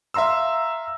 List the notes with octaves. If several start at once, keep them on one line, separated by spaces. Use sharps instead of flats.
E5 F5 A#5 C6 E6